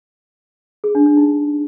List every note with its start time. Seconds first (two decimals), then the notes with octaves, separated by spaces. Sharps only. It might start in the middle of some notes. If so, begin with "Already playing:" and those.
0.84 G#4
0.95 D4
1.06 D4
1.17 D#4